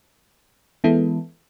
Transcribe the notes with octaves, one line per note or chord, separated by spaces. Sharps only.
E3 G#3 B3 E4 A4